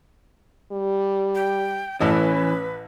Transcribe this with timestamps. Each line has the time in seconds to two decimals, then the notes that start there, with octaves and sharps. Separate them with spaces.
0.72 G3
1.35 G5
2.00 A1 E3 C#4 A4 B4 D#5